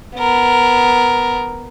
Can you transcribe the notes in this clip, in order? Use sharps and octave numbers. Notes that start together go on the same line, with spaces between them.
B3 A#4